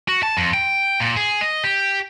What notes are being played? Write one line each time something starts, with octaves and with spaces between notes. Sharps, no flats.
F#4
A5
F2
G5
A#2
G#4
D#5
G4